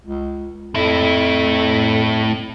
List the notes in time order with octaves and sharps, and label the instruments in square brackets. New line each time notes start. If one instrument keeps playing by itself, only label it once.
[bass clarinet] C#2
[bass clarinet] F2 [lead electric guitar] A2 E4